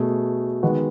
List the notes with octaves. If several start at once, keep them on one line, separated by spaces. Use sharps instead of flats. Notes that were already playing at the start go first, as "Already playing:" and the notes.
Already playing: B2 A3 G#4
D#3 G#3 B3 F#4